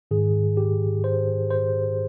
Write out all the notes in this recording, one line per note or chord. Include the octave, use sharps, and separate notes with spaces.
G#2 D#3 G#4
G4
C5
C5